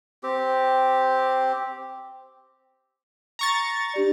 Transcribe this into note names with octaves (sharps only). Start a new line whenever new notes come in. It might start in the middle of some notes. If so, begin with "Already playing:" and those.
C4 G4
A#5 C#6 A6
D4 G4 D5